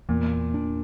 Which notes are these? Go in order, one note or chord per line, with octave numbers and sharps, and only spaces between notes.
E2 A#2
D4